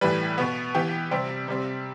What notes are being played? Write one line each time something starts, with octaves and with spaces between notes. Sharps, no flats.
A2 E3 G3 B4
B2 B3
E3 B3 G4
C3 G3 C4
C3 G3 C4